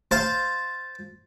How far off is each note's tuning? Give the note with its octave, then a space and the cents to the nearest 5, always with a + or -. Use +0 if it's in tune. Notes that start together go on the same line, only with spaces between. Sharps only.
C5 +0 F5 +0 A5 -5